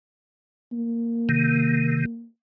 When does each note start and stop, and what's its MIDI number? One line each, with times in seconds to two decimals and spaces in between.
0.72 2.26 58
1.29 2.05 48
1.29 2.05 51